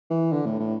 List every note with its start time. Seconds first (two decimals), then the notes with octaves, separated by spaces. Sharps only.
0.10 E3
0.32 D3
0.46 A2
0.60 A2